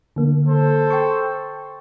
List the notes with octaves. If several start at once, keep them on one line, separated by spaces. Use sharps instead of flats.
D3 A#3
A4 C5
G5 C6 C#6